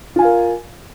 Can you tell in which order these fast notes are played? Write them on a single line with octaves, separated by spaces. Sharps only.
F4 G#5 F5 A#4